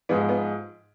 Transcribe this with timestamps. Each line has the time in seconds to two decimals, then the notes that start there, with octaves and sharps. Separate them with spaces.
0.09 G#2 F3 G#3 B3
0.29 B3